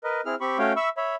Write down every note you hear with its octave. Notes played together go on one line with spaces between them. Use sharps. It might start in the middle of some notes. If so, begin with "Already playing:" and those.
A#4 B4 D#5
C4 E4 G#4 F6
C4 G4 B5 C#6
A3 C#4 F#4 C#5 F5 G5
E5 B5 C#6 E6
C#5 E5 B5